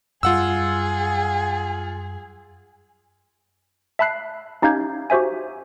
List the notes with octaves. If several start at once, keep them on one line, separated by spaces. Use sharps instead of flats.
F#2 G3 F4 G#4 F#5 E6
E5 A5 B5 F#6 C7
C#4 D#4 G4 F5 G6 G#6
F#4 G4 C5 E5 G#5